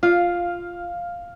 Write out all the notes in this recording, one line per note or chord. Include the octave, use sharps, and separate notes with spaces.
F4 F5